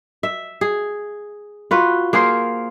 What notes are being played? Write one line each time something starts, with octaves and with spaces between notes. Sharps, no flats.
E5
G#4
F4 F#4 B4
A#3 G#4 A#4 C5